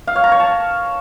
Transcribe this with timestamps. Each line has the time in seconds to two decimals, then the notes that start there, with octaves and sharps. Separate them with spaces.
0.07 F5
0.16 C#5
0.24 A#5
0.32 C#5
0.40 A5